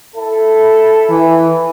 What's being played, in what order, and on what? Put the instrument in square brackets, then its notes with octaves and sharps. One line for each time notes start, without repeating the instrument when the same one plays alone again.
[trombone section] E4 A4
[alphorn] E3